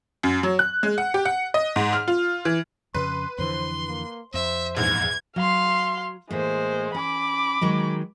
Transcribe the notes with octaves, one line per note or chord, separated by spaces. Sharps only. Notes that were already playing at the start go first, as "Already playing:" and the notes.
F#2
F#3
F#6
G#3
F#5
G4
F#5
D#5
G#2
F6
F4
E3
F2 C#3 B4 C6
F2 D3 E3 C5 C6
A#3
F2 C5 E5
A#1 E2 G#2 G#6
F#3 F5 C6
A2 E3 G#3 A#3 C5
C#4 B5 D6
D#3 F#3 G#3